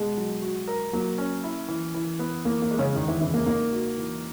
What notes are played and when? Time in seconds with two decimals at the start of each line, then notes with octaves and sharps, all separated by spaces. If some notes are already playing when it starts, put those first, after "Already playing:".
Already playing: B2 G#3
0.17 F#3
0.42 F#4
0.68 A#4
0.93 F#3 A#3
1.18 C#4
1.44 E4
1.68 E3
1.94 E3
2.19 B3
2.45 E3 A#3
2.62 A#3
2.71 G#3
2.79 C#3 C#4
2.95 E2 D#3 D#4
3.08 E3 E4
3.21 C#3 E3 E4
3.34 A#3
3.46 A#3 D#4
3.72 F#4
3.97 E3